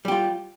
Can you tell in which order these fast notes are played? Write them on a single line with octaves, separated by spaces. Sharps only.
G3 G4 F4